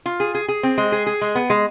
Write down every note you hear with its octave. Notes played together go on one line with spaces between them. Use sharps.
F4
G#4
G#4
G#4
C4
G#3
G#4
G#4
G#3
B3
G#3